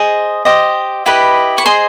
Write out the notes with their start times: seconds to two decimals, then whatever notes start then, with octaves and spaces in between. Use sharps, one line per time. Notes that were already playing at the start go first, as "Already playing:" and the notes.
Already playing: G#4 C5 D#5
0.45 G4 C5 D#5
1.06 E4 G4 B4 D#5
1.58 C#6
1.66 G#4 C5 D#5 C6